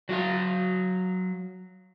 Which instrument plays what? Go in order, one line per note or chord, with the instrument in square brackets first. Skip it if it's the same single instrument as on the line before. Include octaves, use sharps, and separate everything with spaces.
[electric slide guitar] F#3 F#4 F5